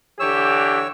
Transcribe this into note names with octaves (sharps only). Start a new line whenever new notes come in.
D3 E3 G4 C#5 E6